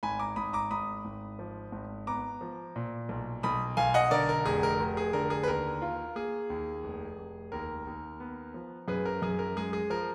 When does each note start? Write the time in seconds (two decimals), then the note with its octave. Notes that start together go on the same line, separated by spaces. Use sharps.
0.03 G#1 G#5 B5
0.19 A#5 D6
0.36 G#1 B5 D#6
0.53 A#5 D6
0.71 G#1 B5 D#6
1.05 G#1
1.39 F3
1.72 G#1
2.07 B3 A#5 D6
2.41 F3
2.76 A#2
3.09 B1
3.43 B1 B5 D#6
3.77 B1 F5 G#5
3.94 D#5 F#5
4.11 D3 A#4 D5
4.29 A#4
4.46 F1 G#4
4.63 A#4
4.80 F1
4.97 G#4
5.13 D3 A#4
5.30 G#4
5.43 B4
5.48 D#2 A#4
5.82 F4
6.15 A#3 G#4
6.50 D#2
6.84 F1
7.18 F1
7.52 D#2 A#4
7.87 D#2
8.20 B3
8.54 F3
8.88 F#2 G#4 B4
9.05 A#4
9.22 F#2 G#4
9.39 A#4
9.56 G#3 G#4
9.73 G#4
9.90 F3 A#4